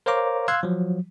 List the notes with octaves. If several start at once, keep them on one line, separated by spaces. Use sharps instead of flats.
A#4 C5 C#5 F5 A#5 D6
F5 C6 E6 F#6 G#6
F3 F#3